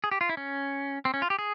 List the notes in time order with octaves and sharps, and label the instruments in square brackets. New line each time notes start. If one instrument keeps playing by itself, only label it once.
[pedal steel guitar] G#4
G4
F4
E4
C#4
C4
C#4
F4
G4
G#4